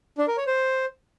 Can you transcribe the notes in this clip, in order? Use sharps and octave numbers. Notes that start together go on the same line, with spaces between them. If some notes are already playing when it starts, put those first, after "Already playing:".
D4
A#4
C#5
C5